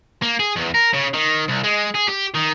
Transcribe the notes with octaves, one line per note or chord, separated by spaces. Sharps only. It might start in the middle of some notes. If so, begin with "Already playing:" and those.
A#3
G#4
E2
A#4
C#3
D#3
C2
G#3
G#4
G4
D#3